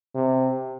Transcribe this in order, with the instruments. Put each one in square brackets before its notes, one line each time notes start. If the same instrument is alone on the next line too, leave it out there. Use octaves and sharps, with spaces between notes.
[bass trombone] C3